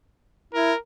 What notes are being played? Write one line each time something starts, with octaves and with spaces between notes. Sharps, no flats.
E4 A#4